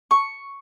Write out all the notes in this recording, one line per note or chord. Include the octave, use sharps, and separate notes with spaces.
C#6